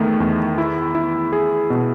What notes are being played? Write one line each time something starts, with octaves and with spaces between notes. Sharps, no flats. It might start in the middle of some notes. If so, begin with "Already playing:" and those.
Already playing: E2 D#3 A3
E2
E4
E4
G#4
B2